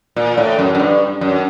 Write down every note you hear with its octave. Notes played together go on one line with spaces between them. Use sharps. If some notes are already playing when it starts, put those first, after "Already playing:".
A#2
A2
F#2
F#2
G2
F#2